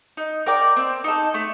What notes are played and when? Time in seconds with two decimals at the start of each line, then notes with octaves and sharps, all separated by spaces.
0.17 D#4
0.46 A#4 D5 G5
0.76 C4
1.04 D#4 A4
1.34 A3